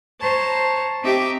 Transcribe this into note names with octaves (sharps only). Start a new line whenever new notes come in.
C5 C#5 A5 A#5
C4 D#4 G4 E5 D6